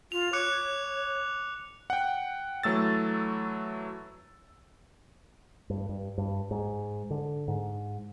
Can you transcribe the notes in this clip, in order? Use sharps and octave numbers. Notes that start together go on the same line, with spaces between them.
F4 F7
C#5 D6 F#6 C#7
F#5 G5
E3 F#3 A3 E6 A6
G2
G2
G2
G#2
D3
G#2